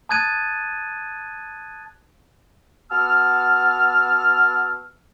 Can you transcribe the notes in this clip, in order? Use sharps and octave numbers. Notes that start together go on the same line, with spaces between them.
A5 D#6 F#6 G#6 A6 D#7
B3 F#4 A5 E6 F6